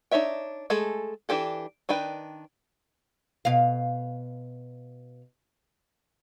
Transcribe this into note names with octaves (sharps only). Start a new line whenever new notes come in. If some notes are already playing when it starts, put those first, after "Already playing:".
D4 D#4 C#5 E5 G5
G#3 A3 G#4 A4
E3 D4 G4 A4
D#3 D4 B4 G5
B2 F5